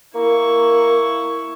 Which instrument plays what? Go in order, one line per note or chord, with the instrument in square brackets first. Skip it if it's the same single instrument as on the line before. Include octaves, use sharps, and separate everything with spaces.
[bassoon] A#3 [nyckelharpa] E4 C#6